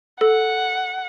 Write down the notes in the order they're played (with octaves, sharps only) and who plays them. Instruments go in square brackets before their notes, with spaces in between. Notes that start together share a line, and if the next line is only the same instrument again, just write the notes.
[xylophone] A4 [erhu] F#5